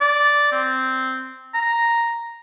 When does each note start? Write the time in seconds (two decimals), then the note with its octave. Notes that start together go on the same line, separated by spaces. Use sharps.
0.01 D5
0.52 C4
1.55 A#5